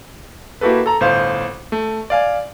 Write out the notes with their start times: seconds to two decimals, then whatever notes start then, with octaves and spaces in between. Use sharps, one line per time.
0.61 A#3 E4 F#4 G4 A4 B4
0.86 A4 A#5
1.00 G1 A2 C5 F5
1.72 A3
2.10 D5 F5 G#5